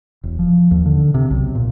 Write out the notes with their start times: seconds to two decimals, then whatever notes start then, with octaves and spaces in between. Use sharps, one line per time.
0.24 E1
0.39 F3
0.71 D#2
0.86 D3
1.14 C3
1.30 B1
1.55 A#2